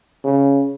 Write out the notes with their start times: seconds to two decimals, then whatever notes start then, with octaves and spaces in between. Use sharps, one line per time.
0.25 C#3